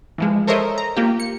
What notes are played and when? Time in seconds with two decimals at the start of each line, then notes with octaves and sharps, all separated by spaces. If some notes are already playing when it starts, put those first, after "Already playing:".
0.18 E3 F3 G#3
0.47 A4 A#4 C5 C#5 D#5 E5
0.78 A#5
0.97 A#3 F4 G4
1.20 C#7